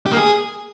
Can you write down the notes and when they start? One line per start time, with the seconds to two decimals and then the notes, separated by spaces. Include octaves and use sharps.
0.06 G4
0.12 A#3
0.17 G#4